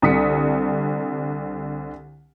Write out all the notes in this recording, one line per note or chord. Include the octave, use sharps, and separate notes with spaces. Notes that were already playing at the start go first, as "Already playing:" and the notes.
C2 D3 D#6 B6 C#7